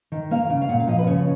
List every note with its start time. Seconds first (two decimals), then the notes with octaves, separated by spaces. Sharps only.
0.12 D#3
0.31 A#3 F5
0.50 C#3
0.62 F5
0.69 A#2 F#5
0.80 F5
0.87 F3 D#5
0.98 B4
1.07 C#3 C#5